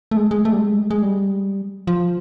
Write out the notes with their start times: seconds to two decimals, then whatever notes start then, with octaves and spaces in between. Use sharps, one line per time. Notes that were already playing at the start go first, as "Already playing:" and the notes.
0.11 A3
0.17 G#3
0.31 G#3
0.45 A3
0.52 G3
0.60 G#3
0.91 G#3
1.02 G3
1.87 F3